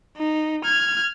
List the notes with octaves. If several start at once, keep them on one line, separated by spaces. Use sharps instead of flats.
D#4
F6 G#6